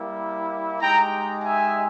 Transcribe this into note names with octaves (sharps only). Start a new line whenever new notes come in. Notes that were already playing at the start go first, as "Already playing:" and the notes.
Already playing: G3 A#3 E4
G#3 D#4 G4 G5 A#5
E5 G#5